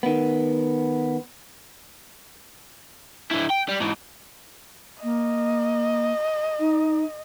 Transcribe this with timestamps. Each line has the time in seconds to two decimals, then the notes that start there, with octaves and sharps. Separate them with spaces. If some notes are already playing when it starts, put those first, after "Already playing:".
0.03 D#3 B3
3.31 D3 E4
3.50 G5
3.68 G3
3.80 G#2 E3
5.03 A#3 D#5
6.59 D#4